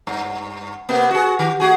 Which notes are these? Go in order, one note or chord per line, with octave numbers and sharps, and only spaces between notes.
G2
C3 A#3 B3
F#4 G#4
D#3 G4
A3 F#4 G#4